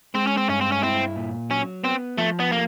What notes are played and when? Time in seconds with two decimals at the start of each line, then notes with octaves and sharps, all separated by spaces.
0.14 G#3 C4
0.27 C#4
0.37 C4
0.49 G2 C#4
0.61 C4
0.72 C#4
0.83 C4 E4
1.16 A#2
1.50 F#3 C#4
1.83 B3 C4
2.18 F3 A3
2.40 B3
2.51 A3 A#3